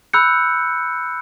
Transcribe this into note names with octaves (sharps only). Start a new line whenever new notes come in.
B5 E6 F#6 G6 C#7